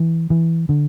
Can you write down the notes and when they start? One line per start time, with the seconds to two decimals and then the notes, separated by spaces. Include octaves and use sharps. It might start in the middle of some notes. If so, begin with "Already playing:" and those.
Already playing: E3
0.30 E3
0.69 D3